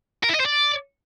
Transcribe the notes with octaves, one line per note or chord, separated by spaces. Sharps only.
A#4
E4
D#5
C5
D5